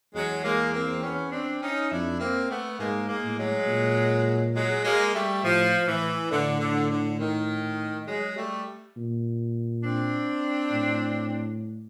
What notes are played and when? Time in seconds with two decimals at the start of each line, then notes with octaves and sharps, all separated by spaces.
0.14 E2 F#3 G#3
0.44 G#3 A#3
0.74 A#3 C4
1.03 B3 C#4
1.32 C4 D4
1.62 C#4 D#4
1.91 F2 D4 E4
2.20 A#3 C4
2.50 A3 B3
2.79 G#2 G#3 A#3
3.08 G#3 A#3
3.24 A2
3.38 F#3 G#3
3.67 A#2
4.55 F#3 G#3
4.84 G#3 A#3
5.14 G3 A3
5.43 A2 F3
5.88 A2 E3
6.31 A2 D3
6.60 D3
6.90 D3
7.20 D#3
8.07 F#3 G#3
8.37 G3 A3
8.96 A#2
9.84 C4 D4
10.71 A2